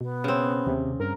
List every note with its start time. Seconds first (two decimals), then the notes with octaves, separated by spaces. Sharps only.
0.01 B2 B3
0.24 C#3 C4
0.66 D#2 C3
1.00 G2 A#4